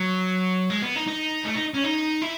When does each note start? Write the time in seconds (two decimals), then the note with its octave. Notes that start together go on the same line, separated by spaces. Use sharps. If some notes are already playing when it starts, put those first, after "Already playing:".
Already playing: F#3
0.70 G#3
0.82 B3
0.96 D#4
1.08 D#4
1.45 A3
1.55 D#4
1.74 C#4
1.84 D#4
2.22 E4